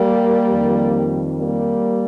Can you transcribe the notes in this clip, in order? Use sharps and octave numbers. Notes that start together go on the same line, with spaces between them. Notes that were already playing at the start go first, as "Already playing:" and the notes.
Already playing: G3 A#3
F2 D#3
G3 A#3